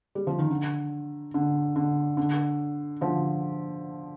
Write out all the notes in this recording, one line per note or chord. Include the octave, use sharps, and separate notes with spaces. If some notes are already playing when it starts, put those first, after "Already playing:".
G3
F3
D#3
D3
D3
D3
D3
D3 F3